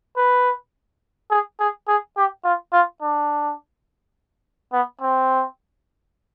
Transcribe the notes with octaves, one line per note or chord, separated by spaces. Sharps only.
B4
G#4
G#4
G#4
G4
F4
F4
D4
B3
C4